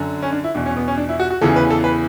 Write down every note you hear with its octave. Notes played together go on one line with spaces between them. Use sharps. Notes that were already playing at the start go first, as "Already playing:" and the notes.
Already playing: F#2 D3
C#4
D4
E4
E2 B2 D4
C#4
B3
C#4
D4
E4
F#4
F#4
E2 C#3 E3 A4
B4
A4
B4